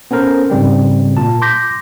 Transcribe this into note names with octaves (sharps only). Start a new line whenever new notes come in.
B3 C#4 A4 A#4 C5
G#2 C#3 G3 C4
A#2 A5
C6 D6 G6 A#6 B6